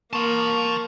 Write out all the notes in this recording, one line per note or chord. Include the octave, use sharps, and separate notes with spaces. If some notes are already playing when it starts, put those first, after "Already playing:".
A#3 A5 C6 C#6